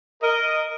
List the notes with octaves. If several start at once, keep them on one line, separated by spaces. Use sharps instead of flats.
A#4 D#5